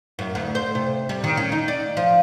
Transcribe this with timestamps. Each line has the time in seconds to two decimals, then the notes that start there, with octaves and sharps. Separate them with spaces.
0.19 F#2
0.35 D2
0.55 C5
0.75 C3
1.09 G3
1.24 D#3
1.37 C#4
1.52 D#4
1.68 D5
1.97 F3